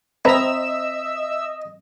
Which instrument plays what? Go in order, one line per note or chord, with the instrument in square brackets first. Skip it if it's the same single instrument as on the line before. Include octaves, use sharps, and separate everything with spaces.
[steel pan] C4 A#5 [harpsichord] B4 [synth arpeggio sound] D#5 [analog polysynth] E5 E6